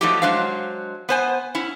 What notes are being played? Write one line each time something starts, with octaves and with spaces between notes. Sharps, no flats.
F3 F#3 A3 D#4 E4 G4
F#3 G#3 D4 C5 F5
B3 C5 G#5
C#4 E4